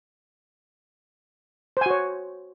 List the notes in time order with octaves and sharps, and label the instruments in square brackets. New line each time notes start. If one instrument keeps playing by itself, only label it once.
[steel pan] C5
G#5
F#4
C#5